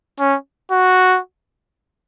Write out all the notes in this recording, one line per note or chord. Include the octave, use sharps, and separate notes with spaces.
C#4
F#4